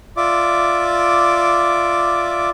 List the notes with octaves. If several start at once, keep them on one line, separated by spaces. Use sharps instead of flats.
F4 D5 E5 D6